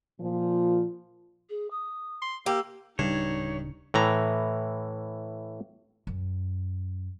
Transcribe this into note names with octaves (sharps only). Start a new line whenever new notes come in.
A#2 F3
G#4
D#6
C6
A#3 G4 E6
D1 G2 C#3 D4 D#4 C#5
A2 E3 A#5
F#2